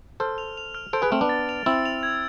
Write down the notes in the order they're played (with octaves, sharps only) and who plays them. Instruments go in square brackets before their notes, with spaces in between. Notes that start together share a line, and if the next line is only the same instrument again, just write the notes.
[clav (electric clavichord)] A4 C5 [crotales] F6
[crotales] F7
F7
F6
[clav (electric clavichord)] A4 C5 [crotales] D7
[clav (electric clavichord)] G#4 B4
[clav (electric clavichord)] A3 C4 [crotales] F6
[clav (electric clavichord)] B3 D4
[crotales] A6
F7
[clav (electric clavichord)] C4 E4 [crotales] E6
[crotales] F7
G#6